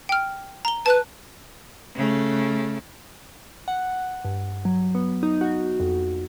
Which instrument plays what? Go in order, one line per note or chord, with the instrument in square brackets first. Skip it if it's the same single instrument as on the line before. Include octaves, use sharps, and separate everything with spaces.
[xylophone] G5 F6
A#5 G7
[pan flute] B4 [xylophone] A5 F#6
[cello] C#3 A3
[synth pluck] F#5
G2
F#3
B3
D#4
F#4
F2